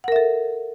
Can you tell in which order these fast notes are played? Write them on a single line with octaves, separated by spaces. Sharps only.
F#5 A#4 E5 A4